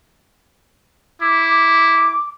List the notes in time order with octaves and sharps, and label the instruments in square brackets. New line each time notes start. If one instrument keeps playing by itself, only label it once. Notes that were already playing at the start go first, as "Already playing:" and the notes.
[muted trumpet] E4 [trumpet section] D6